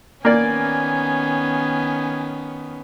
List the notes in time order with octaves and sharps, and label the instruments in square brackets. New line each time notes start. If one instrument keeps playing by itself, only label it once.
[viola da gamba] D#3 B3 C#4 [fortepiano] A#3 D5 [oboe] G#5